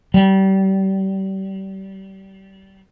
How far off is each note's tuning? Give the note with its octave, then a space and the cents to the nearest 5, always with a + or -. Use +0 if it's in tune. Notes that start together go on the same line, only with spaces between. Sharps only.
G3 -30